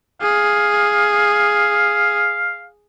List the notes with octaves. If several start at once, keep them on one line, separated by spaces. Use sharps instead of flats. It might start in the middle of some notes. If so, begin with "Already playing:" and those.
G#4 F5